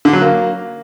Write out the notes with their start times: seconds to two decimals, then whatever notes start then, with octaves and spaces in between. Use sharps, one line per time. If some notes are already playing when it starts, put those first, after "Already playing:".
0.05 D3
0.13 F#3
0.22 A#3